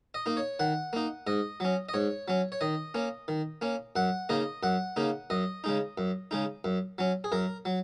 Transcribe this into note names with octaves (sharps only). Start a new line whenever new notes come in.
D#5
A#3 D#4
C#5
D#3 F#5
A#3 D#4
G#2 D#5
F#3 C#4
D#5
G#2 C#5
F#3 C#4
C#5
D#3 D#5
A#3 C#4
D#3
A#3 C#4
F#2 F#5
C#3 A#3 D#4 D#5
F#2 F#5
C#3 A#3 D#4
F#2 D#5
C#3 G#3 D#4
F#2
C#3 G#3 D#4
F#2
F#3 C#4
G#4
F#2 A#4
F#3